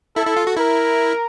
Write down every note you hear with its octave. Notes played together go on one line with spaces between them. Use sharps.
E4 A4
E4
F4
F#4
E4 A#4